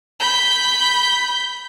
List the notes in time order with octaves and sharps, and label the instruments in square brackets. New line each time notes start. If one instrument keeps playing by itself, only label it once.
[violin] B5 G6